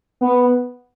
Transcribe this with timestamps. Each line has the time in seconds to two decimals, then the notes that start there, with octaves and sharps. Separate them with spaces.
0.21 B3